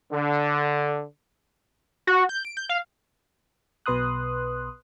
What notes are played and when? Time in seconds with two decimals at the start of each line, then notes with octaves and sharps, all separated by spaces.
0.11 D3
2.07 F#4
2.29 G6
2.45 D7
2.57 G6
2.69 F5
3.86 B1 B2 B4 C6 D#6 F#6